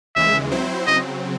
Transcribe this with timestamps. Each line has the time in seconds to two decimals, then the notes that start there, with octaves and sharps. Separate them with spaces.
0.16 D#2 C#3 E3 G#3 E5
0.51 F#3 C4 E4 C5
0.87 C#3 F#3 C4 D#5